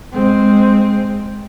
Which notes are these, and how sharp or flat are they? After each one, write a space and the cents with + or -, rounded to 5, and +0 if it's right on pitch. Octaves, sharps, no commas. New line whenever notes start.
G#3 +0 C4 +0